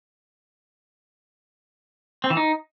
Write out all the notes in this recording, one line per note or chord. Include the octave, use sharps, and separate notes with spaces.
C4
E3
D#4